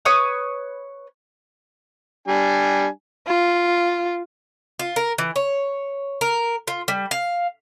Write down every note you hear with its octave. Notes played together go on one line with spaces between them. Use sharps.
B4 C#5 C#6 D#6
G3 D4 G#5
F4
F4
A#4
E3
C#5
A#4
F4
G3
F5